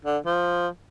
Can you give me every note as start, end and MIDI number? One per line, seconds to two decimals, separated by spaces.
0.05 0.18 50
0.26 0.68 53